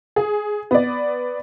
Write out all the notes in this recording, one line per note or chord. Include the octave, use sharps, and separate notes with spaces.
G#4
B3 D5